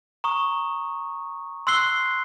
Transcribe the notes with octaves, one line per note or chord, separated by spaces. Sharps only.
A#5 C#6 D#6
C6 E6 F#6 C7 G7